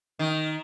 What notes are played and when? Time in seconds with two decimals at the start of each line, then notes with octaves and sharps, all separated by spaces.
0.19 D#3